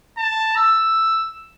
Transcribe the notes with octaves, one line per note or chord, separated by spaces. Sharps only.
A5
E6